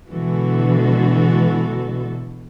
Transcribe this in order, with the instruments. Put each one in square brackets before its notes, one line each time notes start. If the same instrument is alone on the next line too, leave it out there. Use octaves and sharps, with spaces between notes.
[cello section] B2 D3 E3 G#3 F#4 A4